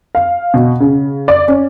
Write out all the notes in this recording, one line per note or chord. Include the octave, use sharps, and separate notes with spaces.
F5
B2
C#3
D5
C#4